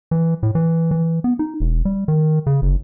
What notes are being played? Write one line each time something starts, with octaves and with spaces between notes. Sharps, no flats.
E3
A2
E3
E3
B3
D#4
E1
G3
D#3
C#3
F#1